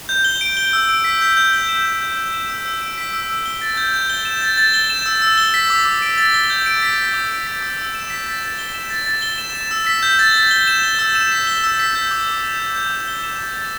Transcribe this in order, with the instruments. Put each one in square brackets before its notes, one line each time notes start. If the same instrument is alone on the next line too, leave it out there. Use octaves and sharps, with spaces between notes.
[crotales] G6
G7
D7
G7
E6
D7
B6
G6
G6
G7
E7
G6
G6
G7
E7
E6
E6
D7
B6
E6
E6
G7
A6
G6
G6
G7
E7
A6
A6
G7
E7
E6
E6
G7
B6
D6
D6
D7
A6
G7
G6
D7
B6
G7
D6
D7
B6
E6
E6
E7
B6
A6
A6
G7
E7
A6
A6
G7
E7
E7
E6
B6
G6
A6
A6
G7
E7
G7
E6
E7
B6
G7
E6
B6
G6
D6
D6
E7
G6
G6
G6
G7
E7
A6
A6